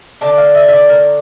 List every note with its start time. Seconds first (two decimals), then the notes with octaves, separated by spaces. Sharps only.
0.21 D3 A3 D4 A5
0.38 F5
0.55 E5
0.68 E5
0.73 D5
0.89 A#4